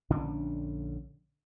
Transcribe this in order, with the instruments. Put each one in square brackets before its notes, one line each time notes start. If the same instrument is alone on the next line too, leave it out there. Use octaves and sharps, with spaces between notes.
[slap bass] A#1 D3 C#4 D4